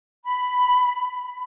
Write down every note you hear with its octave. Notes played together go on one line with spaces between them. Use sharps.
B5